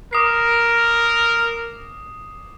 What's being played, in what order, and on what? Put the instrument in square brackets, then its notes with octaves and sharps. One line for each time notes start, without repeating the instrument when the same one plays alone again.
[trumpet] A#4 [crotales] D6 D#6 C7